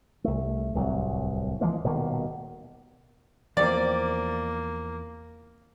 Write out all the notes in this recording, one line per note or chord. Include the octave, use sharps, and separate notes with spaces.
C2 A3
D1 C2 F#3
E3 F3 G#3 A#3
D#1 B2 D#3 A#3
E2 F3 A#3 C4 D5